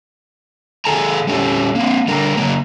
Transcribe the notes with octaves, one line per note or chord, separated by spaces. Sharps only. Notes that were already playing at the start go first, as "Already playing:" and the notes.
D#3 G#4 A4 G#5 A#5
G3 C#4 G4 A4
A#3 C4
D3 G3 A#4
C#3 F#3 A#3